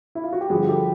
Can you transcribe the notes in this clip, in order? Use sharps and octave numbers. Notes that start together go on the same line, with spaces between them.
E4
F4
F#4
G4
G2 D3 F3 F#4 G#4
G4 A4